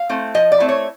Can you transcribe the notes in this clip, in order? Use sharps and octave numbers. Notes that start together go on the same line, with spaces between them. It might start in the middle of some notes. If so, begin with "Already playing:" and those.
Already playing: F5
A3 C4 E4
F3 D#5
D5
A3 C4 E4
C#5